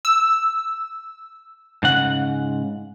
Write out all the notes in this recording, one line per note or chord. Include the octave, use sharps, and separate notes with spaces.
E6
G#2 C#3 F#5